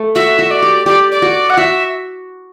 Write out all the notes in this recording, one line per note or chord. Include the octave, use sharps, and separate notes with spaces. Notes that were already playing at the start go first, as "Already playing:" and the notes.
Already playing: A3
F#4 E5
F#4
D5
G4
G4 D5
D5
F#4
F#5
F#4 E5